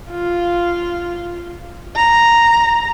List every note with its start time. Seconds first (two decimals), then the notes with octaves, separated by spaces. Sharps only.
0.10 F4
1.96 A#5